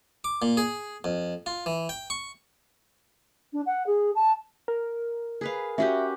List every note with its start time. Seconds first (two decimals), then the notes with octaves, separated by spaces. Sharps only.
0.24 D6
0.42 A#2
0.57 G#4
1.04 F2
1.46 F4
1.66 E3
1.89 G5
2.10 C#6
3.53 D4
3.66 F#5
3.86 G#4
4.15 A5
4.68 A#4
5.41 G#4 B4 F5
5.78 C#4 F#4 G4 E5